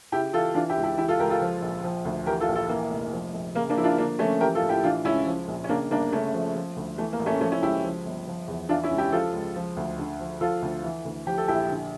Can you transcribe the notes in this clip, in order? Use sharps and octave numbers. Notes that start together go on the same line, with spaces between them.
C#3 E4 G4
E3 F4 A4
E3 D4 F4
E4 G4
C#2
E4 G4
E3 E4 G4
F4 A4
C#2 G4 A#4
F4 A4
F3
A#1
F3
D2
E3 G4 A#4
F4 A4
A#1
F4 A4
E3 A#3
F1
F3
A#1
C#3 A#3
A#3 D4
F3 E4
D4 F4
D3 A#3 D4
F3 A3 C#4
E3 G4 A#4
F4 A4
A1
E4 G4
E3 D4 F4
C#2 C#4 E4
F3
A#1
C#4
C#3 A#3 D4
G1 A#3 D4
C#3 A3 C#4
F3
F3
D2
E3 A3
A#3
A1
A3 C#4
F3 A3 C#4
C#4 E4
C#2 E4 G4
F3
G1
F3
E2
E3 D4 F4
C#4 E4
C#2
E4 G4
F3 F4 A4
C#2
F3
D2
D3
F3
F3 F4 A4
D2
E3
D2
F3 G4
A4
A#1 E4 G4
D3